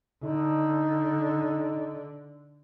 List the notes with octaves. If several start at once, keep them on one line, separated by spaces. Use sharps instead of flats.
D3 D#4